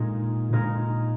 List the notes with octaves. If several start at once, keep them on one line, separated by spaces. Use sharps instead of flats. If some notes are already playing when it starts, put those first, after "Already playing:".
Already playing: A#2 G#3 D#4 A#4
A#2 G#3 D#4 A#4